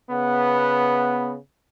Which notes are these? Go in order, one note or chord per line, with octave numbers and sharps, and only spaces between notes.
C#3 B3